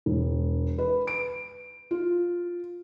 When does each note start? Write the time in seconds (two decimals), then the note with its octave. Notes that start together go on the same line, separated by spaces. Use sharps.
0.06 E1
0.78 B4
1.07 D7
1.91 F4